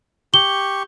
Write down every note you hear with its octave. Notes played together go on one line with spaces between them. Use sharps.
G4 C#6 G7